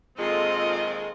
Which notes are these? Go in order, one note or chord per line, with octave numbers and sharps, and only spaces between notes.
A#2 D#3 G#3 C4 F4 A4 D#5